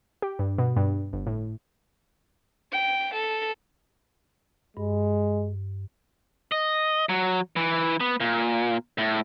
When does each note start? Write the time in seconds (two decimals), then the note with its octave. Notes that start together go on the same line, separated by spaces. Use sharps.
0.22 G4
0.39 G2
0.58 B2
0.76 G2
1.13 G1
1.27 A2
2.72 G5
3.13 A4
4.77 G2 G#3
6.52 D#5
7.09 F#3
7.56 E3
8.00 B3
8.20 A#2
8.98 A2